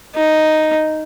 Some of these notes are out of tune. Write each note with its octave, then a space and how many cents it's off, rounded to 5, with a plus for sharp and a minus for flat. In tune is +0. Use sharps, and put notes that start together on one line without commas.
D#4 +0